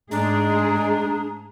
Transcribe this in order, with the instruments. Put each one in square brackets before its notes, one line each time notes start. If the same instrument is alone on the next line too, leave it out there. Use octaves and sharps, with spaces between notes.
[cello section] G#2 A3 G#4 [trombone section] G#3 [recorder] D4 [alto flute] A#5